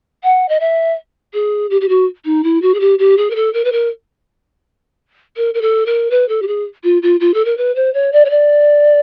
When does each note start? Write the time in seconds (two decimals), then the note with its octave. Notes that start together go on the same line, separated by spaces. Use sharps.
0.24 F#5
0.49 D#5
0.60 E5
1.34 G#4
1.70 G4
1.81 G4
1.89 F#4
2.25 D#4
2.44 E4
2.62 F#4
2.74 G#4
2.80 G4
2.99 G4
3.17 G#4
3.30 A#4
3.35 A4
3.54 A#4
3.65 B4
3.72 A#4
5.37 A#4
5.54 A#4
5.62 A4
5.86 A#4
6.11 B4
6.29 A4
6.42 G4
6.47 G#4
6.84 F4
7.03 F4
7.20 F4
7.34 A4
7.45 A#4
7.57 B4
7.75 C5
7.94 C#5
8.13 D5
8.25 C#5
8.30 D5